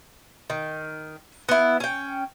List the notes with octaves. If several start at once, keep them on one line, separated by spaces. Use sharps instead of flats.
D#3
B3 E4
C#4 G5